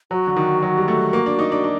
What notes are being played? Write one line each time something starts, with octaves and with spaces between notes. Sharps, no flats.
F#3 F#4
D3
D#3
F#3
G3
A3
A#3
D4
D#4
D4
D4